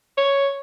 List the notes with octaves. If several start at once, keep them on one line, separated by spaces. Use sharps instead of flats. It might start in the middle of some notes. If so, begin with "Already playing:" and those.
C#5